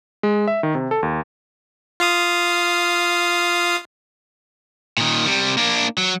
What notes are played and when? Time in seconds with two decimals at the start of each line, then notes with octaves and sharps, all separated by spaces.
0.23 G#3
0.47 E5
0.63 D#3
0.75 C3
0.91 A4
1.03 D#2
2.00 F4 F5 D#6
4.98 A#2 D#3
5.26 C3 G3
5.57 A#3 D4
5.98 F#3